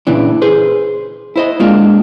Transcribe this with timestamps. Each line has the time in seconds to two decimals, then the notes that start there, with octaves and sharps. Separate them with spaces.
0.07 A#2 C#3 E3 D4
0.42 G#4 B4 C5
1.36 E4 C5 D#5
1.60 G#3 A#3 D4 F4